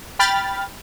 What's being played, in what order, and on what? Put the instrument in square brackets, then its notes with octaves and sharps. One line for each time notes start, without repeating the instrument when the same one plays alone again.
[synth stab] G5 B5 F6 A6